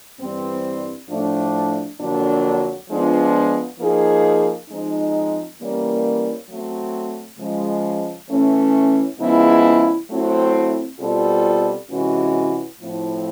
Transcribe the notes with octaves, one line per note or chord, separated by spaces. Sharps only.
G2 E3 G3 C4
A2 F3 A3 D4
F2 D3 F#3 A#3 D4
F3 G#3 B3 D4 F4
F3 A#3 D#4 G#4
F3 G#3 C4 D#4
E3 G3 A#3 C#4
F#3 A3 C4
C#3 F3 G#3
E3 A3 C#4
C#3 F3 G#3 B3 E4
F#3 A3 C4 E4
B2 G3 C4 F4 A4
C3 E3 G#3 C#4 F#4
A2 F3 A3 C4 E4